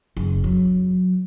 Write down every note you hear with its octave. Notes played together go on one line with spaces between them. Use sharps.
F#1
F#3